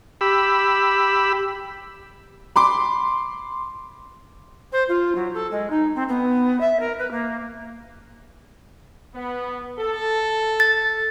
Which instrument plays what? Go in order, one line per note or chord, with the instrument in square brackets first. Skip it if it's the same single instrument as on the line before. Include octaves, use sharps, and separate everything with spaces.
[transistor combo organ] G4 B5 E6
[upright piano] B5 C6 D6
[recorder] C5
F4
F#3
A4
G#3
D#4
C4
B3
E5
A#4
B4
A#3
[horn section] B3
A4
[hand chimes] A6